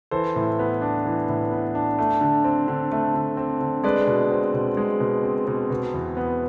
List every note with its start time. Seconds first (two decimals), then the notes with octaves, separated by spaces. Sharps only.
0.11 E3 A4 C5
0.36 A2
0.59 B3
0.81 D4
1.06 E3
1.29 A2
1.51 B3
1.75 D4
1.98 A3
2.21 D3
2.44 C4
2.68 D3
2.92 A3
3.15 D3
3.37 C4
3.61 D3
3.84 G#3 B4 D5
4.07 B2
4.31 C4
4.54 B2
4.77 G#3
5.00 B2
5.23 C4
5.47 B2
5.70 B2
5.94 E2
6.17 B3